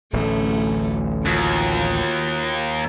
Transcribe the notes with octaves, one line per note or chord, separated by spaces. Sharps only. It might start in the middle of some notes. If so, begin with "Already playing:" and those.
D1 A1 A3 C#4
D#2 F4 F#4